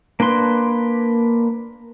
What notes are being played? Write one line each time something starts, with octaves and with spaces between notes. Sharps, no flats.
A#3 D4 B4 C6